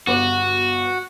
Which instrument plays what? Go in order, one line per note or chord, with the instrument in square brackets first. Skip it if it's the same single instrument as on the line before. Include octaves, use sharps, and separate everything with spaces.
[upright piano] G1 B3 D6 [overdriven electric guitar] F#4